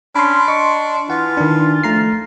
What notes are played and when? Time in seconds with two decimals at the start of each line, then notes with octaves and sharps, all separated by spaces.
0.15 C#4 D4 B5 C6
0.48 D#5 C#6
1.10 E3 F4 F#5
1.37 D#3 D4
1.84 F3 A3 A#5 C7